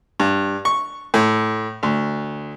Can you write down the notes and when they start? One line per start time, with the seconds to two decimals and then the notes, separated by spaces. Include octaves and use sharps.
0.20 G2
0.65 C#6
1.14 A2
1.83 D2